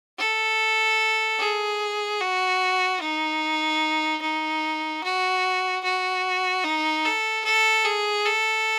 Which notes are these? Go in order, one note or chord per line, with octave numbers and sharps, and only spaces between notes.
A4
G#4
F#4
D#4
D#4
F#4
F#4
D#4
A4
A4
G#4
A4